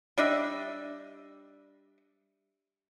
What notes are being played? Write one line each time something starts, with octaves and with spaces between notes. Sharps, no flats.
G3 D4 D#5 E5